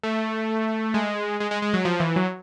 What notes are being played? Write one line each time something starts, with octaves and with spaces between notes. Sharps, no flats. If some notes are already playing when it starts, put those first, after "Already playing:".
A3
G#3
G#3
G#3
G#3
F#3
F3
E3
F#3